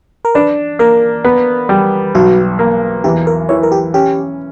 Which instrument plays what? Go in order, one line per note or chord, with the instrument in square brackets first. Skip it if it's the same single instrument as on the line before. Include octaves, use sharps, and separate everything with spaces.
[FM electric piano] A#4
[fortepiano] D4 [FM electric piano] B4
[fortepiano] A#3 [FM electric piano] A#4
[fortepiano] B3
G3
[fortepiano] B1 [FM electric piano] F#4
[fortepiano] A#3
[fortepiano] E2 [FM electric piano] G4
[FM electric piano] A#4
[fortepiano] E3 [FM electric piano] C#5
[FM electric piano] A#4
G4
[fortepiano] C#4 [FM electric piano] G4